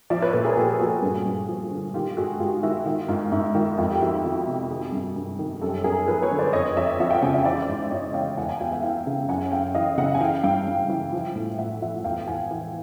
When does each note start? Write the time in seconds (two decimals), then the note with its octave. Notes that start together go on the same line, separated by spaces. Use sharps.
0.10 F3 D5 E5
0.22 B4 C#5
0.33 A#2 A4 B4
0.45 G#4 A#4
0.57 A#2 G4 A4
0.80 F3 F#4 G#4
1.02 G2
1.26 G2
1.49 F3
1.71 D3
1.94 D#3 F4 G4
2.17 G#2 F#4 G#4
2.40 G#2 F4 G4
2.63 D#3 E4 F#4
2.86 D#3 F4
3.09 G#2 F4
3.32 G#2 E4
3.55 D#3 F4
3.77 F2 F4
3.91 G4
4.01 F2 E4 F#4
4.24 D#3 F4
4.47 C3
4.70 D#3 F#4 G#4
4.92 G2
5.16 G2
5.39 D#3
5.61 F#2 G4 A4
5.84 F#2 G#4 A#4
6.08 F3 A4 B4
6.22 B4 C#5
6.31 D3
6.38 C5 D5
6.53 F2 C#5 D#5
6.76 F2 D5 E5
7.00 F3 E5 F#5
7.10 F5 G5
7.22 C#3 F#5 G#5
7.34 D5 E5
7.45 E3 C5 D5
7.69 G#2
7.84 E5
7.91 G#2 C#5 D#5
8.14 E3 F5 G5
8.37 E2 F#5 G#5
8.49 F#5 G#5
8.60 E2 F5 G5
8.72 E5 F#5
8.83 E3 F5 G5
9.07 C#3
9.29 F#2 F#5 G#5
9.52 F#2 F5 G5
9.75 E3 D#5 F5
9.98 C#3 E5 F#5
10.15 G#5
10.20 E3 F5 G5
10.44 G2 F5 G5
10.68 G2
10.89 E3
11.12 F3
11.35 A2
11.58 A2 E5 F#5
11.82 F3 E5 F#5
12.04 E2 F5 G5
12.27 E2 F#5 G#5
12.51 E3